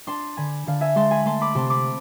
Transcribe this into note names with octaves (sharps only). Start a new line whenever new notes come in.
D4 A5 C6
D3 G#5 B5
D3 F5 A5
E5 G#5
G#3 A5 C6
G#5 B5
A3 A5 C6
B5 D6
C3 A5 C6
B5 D6